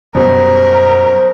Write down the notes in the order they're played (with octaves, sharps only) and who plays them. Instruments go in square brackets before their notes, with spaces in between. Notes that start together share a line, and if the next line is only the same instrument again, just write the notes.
[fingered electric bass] F#2 [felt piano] B2 G3 [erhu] A#4 [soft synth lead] C5